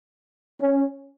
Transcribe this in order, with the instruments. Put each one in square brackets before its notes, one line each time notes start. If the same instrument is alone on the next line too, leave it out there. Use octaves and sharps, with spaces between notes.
[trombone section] C#4